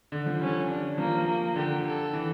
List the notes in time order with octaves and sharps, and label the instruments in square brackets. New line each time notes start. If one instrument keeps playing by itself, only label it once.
[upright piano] D3
F3
[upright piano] G3 [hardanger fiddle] C#4
[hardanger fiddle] D4
[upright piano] F3 [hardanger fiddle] A#3
[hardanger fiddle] A#3
[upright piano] D3 [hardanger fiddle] G4
[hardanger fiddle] A4
[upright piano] E3